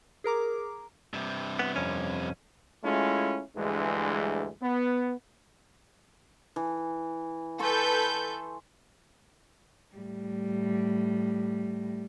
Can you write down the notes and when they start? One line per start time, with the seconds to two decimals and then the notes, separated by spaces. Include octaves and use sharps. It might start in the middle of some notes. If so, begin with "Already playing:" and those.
0.24 G#4 A#4 A#5 D6
1.13 G2 C3
1.59 B3
1.76 F2 C#4
2.83 G#3 A3 C#4 E4 F4
3.55 D2 G2 E3 G#3
4.61 B3
6.56 E3
7.59 A4 B4 G#5 C6 C#6 G6
9.95 A2 G3